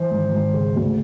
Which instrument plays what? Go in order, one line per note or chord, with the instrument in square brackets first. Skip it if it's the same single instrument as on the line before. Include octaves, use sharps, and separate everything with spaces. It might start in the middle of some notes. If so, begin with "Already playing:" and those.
Already playing: [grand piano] E3 C5
G#1
G#1
C#3
D2